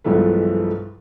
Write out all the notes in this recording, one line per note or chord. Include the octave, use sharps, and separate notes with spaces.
B1 G2 E3 F3 G#3 A3